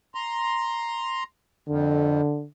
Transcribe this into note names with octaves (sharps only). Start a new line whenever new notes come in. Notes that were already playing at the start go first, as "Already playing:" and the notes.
A#5 C6
F2 D3